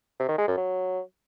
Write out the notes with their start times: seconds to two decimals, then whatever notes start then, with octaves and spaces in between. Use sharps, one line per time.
0.20 C3
0.29 D#3
0.38 G#3
0.48 F#2
0.57 F#3